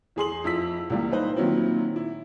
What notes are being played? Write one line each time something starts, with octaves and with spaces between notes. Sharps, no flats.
E2 G#4 C6 F#7
F2 E4 E6 B6
C#2 E3 G3 A#3
D#4 B4 C5
A#2 D#3 F#3 C4 E4
E4